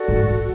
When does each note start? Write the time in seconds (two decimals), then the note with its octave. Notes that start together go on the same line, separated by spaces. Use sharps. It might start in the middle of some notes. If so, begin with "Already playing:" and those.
Already playing: F#4 A4 D5
0.08 G#2